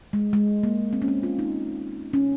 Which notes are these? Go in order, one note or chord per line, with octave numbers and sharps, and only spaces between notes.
G#3
G#3
A#3
C4
C#4
C4
F4
D#4
C#4